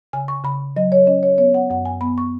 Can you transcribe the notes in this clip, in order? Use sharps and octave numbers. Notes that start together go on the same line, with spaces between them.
C#3 G#5
C#6
C#3 B5
F#3 D#5
C#5
C#4 D#5
C#5
B3 C#5
F#5
F#2 F#5
G#5
B3 B5
C#6